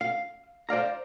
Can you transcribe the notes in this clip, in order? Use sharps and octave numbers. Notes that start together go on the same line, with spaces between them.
F5
C5 D5 F5 A#5